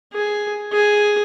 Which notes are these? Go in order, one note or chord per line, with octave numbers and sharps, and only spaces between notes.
G#4
G#4